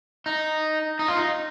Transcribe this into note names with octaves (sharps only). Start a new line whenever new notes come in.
D#4
D#4
F4
D#4